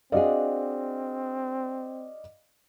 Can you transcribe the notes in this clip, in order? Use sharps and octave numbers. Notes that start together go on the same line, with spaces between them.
C4 D4 F#4 G#4 D5 D#5 F5